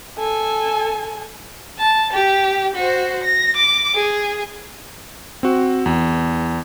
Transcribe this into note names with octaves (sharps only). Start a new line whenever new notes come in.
A4 G#5
A5
G4
F#4 C5
A#6
D6
G#4
C4 F#4
E2